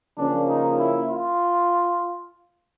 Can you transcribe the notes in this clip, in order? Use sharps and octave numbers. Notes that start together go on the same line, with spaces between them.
C#3 F3 A#3 C#4 D4
D#4
E4
F4